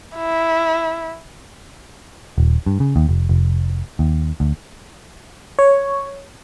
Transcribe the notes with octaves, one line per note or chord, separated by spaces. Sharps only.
E4
D#1
G2
C#3
D#2
F1
F1
D#2
D2
C#5